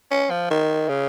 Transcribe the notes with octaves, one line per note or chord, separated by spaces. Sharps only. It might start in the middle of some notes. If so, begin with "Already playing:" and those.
C#4
F3
D#3
C#3